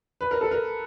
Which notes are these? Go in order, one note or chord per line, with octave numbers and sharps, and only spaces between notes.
B4
A#4
A4
A#4